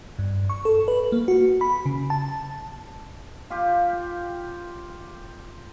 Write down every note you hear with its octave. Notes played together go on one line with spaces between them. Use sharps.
G2
C#6
A4
B4
A#3
F#4
B5
C#3
A5
F4 G4